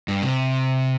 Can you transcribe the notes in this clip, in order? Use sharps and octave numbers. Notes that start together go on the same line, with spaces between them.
G2
C3